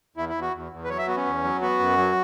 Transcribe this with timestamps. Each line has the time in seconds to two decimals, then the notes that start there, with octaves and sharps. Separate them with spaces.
0.17 E2 E4
0.29 E4
0.35 E2
0.42 F#4
0.53 E2
0.72 E2
0.84 B4
0.89 F#3 C#5
0.98 E5
1.07 B3 F#4
1.16 C#4
1.26 E2
1.44 F#3
1.62 B3 F#4
1.79 F#2
1.98 F#3